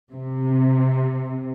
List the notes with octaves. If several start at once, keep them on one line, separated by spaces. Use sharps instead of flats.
C3